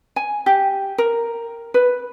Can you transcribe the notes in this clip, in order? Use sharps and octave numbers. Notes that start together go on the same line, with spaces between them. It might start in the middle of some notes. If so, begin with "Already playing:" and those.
G#5
G4
A#4
B4